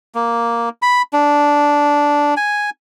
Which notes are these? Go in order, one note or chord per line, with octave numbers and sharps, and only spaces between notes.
A#3
B5
D4
G#5